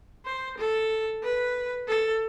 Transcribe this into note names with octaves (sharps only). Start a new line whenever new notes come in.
C5
A4
B4
A4